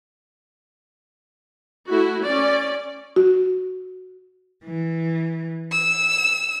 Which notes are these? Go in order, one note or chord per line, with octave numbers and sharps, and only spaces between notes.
A3 E4 F#4
C#4 D5
F#4
E3
E6